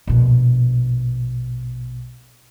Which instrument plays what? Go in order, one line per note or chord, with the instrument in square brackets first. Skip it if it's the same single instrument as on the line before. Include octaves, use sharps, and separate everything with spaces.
[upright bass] A#1 B2